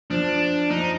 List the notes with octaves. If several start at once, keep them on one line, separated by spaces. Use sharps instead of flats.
F3 D4
F3 D#4